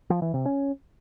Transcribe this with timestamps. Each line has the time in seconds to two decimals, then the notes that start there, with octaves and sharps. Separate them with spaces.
0.10 F3
0.22 E3
0.34 C3
0.46 C#4